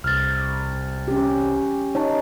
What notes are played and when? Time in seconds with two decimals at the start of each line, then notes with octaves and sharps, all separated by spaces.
0.04 C2 F6 A6
1.08 C#4 G4
1.95 D#4 C#5 A5